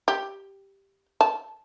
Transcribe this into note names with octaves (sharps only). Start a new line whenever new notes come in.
G4
A5